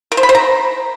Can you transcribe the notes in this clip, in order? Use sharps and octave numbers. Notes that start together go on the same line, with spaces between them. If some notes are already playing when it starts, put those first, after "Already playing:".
A#4
C5
B5
C5
A#5